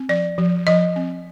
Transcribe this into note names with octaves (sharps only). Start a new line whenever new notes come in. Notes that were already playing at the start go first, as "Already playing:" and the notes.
Already playing: C4
F3 D5
F3
F3 D#5
C4